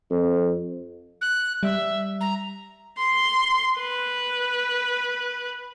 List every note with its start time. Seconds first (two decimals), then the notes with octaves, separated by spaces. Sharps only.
0.10 F2
1.21 F#6
1.63 G3 E5
2.21 A#5
2.99 C6
3.80 B4